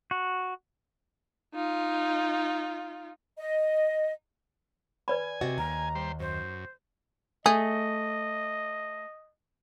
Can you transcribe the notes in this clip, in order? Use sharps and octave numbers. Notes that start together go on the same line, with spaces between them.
F#4
D#4 F4
D#5
B4 D5 G#5 B5
C3 F#4 D#5
D#2 A#5
G3 C5
F#2 C5
A3 G#4 D#5